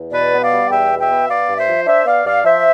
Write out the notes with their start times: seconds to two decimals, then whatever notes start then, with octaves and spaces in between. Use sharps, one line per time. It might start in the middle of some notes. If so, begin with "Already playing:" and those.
Already playing: E2
0.12 B2 B4 D5
0.32 B3
0.42 D5 F5
0.51 G3
0.70 E2 E5 G5
0.90 B2
0.99 E5 G5
1.09 B3
1.29 B3 D5 F5
1.48 G2
1.58 C5 E5
1.67 F3
1.86 D4 C5 E5
2.06 B3 D5 F5
2.25 G2 D5 F5
2.44 F3 C5 E5